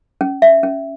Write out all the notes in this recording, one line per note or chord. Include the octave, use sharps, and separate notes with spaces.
C#4
E5
C#4